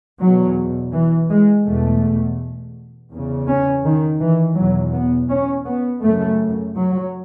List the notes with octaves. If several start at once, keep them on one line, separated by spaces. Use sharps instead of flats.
E2 B2 F#3
E3
G#3
E2 B2 A3
E2 C#3
C#4
D#3
E3
E2 B2 F#3
B3
C#4
B3
F#2 C#3 A3
F#3